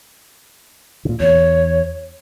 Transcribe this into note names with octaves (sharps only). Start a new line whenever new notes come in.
A#2 D3
E2 C#5